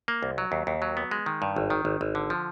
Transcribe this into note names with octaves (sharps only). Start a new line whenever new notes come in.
A#3
C2
F#3
D#2
D#2
F#3
B3
G#3
D#3
G2
G#1
D#3
G#1
G#1
D3
F3